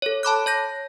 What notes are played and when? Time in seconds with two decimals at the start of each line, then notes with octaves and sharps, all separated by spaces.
0.02 A4 C#5
0.23 A5 B5 D6 F#6
0.46 C#5 G6 A#6